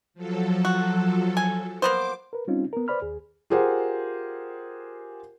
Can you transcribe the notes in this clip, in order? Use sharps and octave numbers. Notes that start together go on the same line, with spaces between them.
F3 F#3 A4
F#4
G#5
A#3 B3 C5 D6
A#4 B4
G3 C4 C#4 D#4 F4
B3 A#4
B4 C5 D5 B5 F6
D#2 G#4
F4 G4 G#4 A#4 C5 F#5